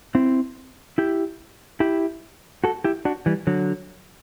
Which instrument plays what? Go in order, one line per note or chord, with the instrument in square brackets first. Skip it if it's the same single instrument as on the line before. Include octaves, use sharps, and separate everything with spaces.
[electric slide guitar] C4 E4
E4 G4
E4 G4
F#4 A4
E4 G4
D4 F#4
E3 G3
D3 F#3